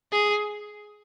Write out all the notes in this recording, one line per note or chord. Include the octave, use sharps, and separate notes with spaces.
G#4